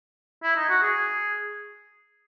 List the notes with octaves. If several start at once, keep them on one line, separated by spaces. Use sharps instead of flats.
E4
D#4
F#4
G#4